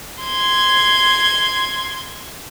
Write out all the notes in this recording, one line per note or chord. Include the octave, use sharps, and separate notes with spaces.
C6 G#6